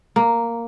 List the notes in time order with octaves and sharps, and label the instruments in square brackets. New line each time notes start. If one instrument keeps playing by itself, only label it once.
[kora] A#3